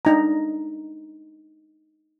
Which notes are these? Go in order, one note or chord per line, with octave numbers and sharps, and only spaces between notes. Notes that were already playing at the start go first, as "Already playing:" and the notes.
D4 D#4 A#5